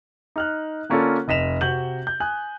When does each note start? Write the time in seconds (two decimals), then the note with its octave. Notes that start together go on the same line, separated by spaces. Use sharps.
0.36 D#4 F6 F#6
0.89 D3 A#3 C#4 D4 F4 A4
1.28 F1 D#5 B6 E7 F7
1.61 C3 F#4 G6 F#7
2.07 G6
2.20 G#5 D#6 F#6